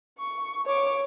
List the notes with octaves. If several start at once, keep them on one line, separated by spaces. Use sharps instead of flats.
C#6
C#5 D6